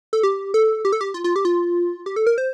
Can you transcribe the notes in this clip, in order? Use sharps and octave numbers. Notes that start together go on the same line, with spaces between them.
A4
G4
A4
G4
A4
G4
F4
F4
G4
F4
G4
A4
A#4
C5